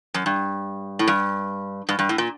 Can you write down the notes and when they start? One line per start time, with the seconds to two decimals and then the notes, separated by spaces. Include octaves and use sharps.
0.14 F#2
0.26 G2
0.99 A2
1.08 G2
1.89 G2
1.99 G2
2.09 A2
2.18 A#2